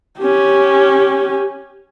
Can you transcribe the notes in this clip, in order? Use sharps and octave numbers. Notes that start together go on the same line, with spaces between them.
C#4 G4